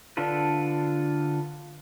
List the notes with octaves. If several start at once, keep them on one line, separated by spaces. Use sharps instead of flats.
D3 D4 F4 A4 B4